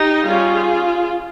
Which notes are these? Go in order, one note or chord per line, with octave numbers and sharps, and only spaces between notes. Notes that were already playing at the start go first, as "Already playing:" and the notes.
Already playing: D#4 G4
G3 C#4 F4 G#4